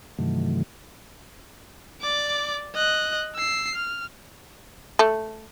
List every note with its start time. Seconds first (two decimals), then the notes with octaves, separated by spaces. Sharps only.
0.19 G2 C3 D#3 E3 F#3 A3
2.02 D5 D6
2.75 D#5 F#6
3.35 E6 C7
3.75 F6
4.99 A3